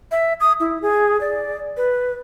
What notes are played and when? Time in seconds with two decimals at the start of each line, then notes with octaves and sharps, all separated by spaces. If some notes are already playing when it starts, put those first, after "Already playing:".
0.11 E5
0.40 D#6
0.60 E4
0.82 G#4
1.21 D5
1.77 B4